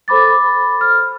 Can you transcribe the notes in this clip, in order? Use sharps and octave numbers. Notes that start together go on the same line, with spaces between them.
A4 C5 B5 D6 A6
F6